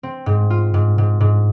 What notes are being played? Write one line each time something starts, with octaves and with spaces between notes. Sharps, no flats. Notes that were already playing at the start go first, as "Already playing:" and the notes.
C4
G#2
F4
G#2
G#2
G#2